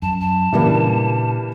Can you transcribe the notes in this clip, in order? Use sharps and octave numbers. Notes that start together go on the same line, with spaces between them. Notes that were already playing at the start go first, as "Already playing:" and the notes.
F#2 A5
A5
A#2 C#3 E3 G3 A#3 D4